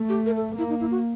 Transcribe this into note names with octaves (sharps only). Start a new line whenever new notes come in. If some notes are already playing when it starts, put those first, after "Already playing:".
Already playing: A3
G4
A#4
A4
A#3 E4
D#4
E4
F#4